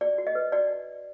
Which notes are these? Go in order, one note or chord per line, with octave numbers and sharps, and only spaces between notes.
F#4 D5
F#4
D#5
B4
F#4 D5